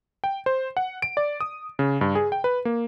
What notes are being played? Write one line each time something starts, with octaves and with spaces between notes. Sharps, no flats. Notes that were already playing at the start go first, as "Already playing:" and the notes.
G5
C5
F#5
D7
D5
D#6
C#3
G2
G#4
G5
B4
A#3